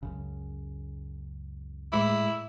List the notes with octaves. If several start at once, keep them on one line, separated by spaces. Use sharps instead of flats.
C#2 F#2 C#3
A2 G#3 E4 D6